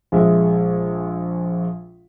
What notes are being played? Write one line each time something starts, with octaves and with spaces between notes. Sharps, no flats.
A#1 G#3 E5